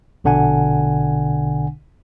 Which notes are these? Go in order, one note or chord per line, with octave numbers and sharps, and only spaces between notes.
A#1 B2 D3 D4 F#5 G#5